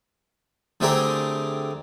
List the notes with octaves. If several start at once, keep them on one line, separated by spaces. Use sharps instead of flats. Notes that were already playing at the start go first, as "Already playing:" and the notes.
D3 A3 C4 G4 G#4 A#4